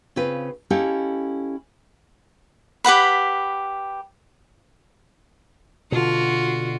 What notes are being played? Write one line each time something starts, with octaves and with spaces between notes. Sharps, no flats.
C#3 C4 F4 B4
C#4 E4 G4 A4 D#5 F5
G4 B4 F#5 B5
B2 D3 F4 F#4